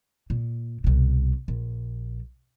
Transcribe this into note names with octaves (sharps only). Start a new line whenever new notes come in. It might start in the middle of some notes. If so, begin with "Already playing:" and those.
A#2
C2 B2
A#1